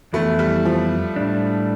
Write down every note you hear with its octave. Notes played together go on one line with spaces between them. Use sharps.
F2 E3 A3 B3 E4
G3
F3
A2 G3 D4